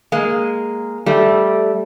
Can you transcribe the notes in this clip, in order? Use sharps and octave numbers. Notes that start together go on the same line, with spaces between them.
G#3 A#3
G3 A3